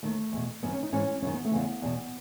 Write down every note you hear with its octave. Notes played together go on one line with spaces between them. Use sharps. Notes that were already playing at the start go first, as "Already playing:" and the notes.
D#2 D#3 A3
E2 B2
F#2 D#3 B3
C#4
D#4
G#2 E3 C#4
F#2 D#3 C#4
B3
A3
E2 C#3 E3 B3
E2 B2